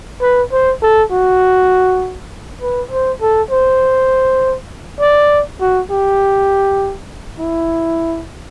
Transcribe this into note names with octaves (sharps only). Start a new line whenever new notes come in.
B4
C5
A4
F#4
B4
C5
A4
C5
D5
F#4
G4
E4